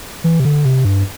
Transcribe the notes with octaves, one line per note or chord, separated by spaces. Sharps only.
E3
C3
D3
C3
G2